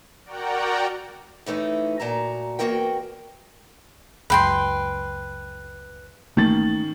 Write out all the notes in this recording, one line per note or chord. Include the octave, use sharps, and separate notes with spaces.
F#4 A#4 D5 F#5 G5 A#5
A2 E3 A3 D#4
A#2 F#4 A5 A#5
E2 G#2 A#3 F#4 A#4 G5
C#2 F#2 B4 G5 C6
G#1 D#3 E3 A3 A#3 C#4 A6